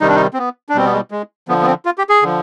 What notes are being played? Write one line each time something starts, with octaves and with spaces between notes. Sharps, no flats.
C3 D#3 G3 D#4
D4
D#4
C4
B3
D4
B2 G3 C4
B3
G#3
G#3
D3 F3 B3
B3
C4
F4
G4
G#4
D3 F3